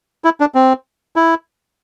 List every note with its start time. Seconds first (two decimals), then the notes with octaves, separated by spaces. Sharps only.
0.24 E4
0.40 D4
0.55 C4
1.16 E4